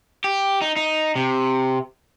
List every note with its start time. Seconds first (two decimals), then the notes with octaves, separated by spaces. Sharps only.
0.24 G4
0.62 D#4
0.76 D#4
1.16 C3